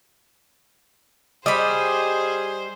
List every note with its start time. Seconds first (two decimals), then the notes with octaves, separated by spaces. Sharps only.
1.46 G3 G#4 C5 D#5 B5